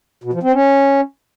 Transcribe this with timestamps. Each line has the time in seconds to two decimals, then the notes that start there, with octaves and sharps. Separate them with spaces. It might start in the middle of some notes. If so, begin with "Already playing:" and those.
0.24 B2
0.33 F3
0.43 C4
0.53 C#4